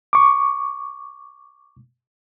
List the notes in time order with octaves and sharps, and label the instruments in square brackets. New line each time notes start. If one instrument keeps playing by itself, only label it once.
[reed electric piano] C#6 D6